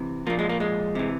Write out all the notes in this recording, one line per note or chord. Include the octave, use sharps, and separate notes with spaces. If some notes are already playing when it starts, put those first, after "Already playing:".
Already playing: C3 E3
A#2 F3 A#3
G#3
A#3
G#3
C3 E3